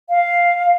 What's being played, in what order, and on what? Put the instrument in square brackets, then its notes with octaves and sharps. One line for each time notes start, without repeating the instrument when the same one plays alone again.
[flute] F5